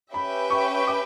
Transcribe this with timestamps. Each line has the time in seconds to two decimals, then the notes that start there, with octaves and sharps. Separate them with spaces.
0.14 C#4 G4 B4 E5 G5 B5
0.50 C#6
0.87 D6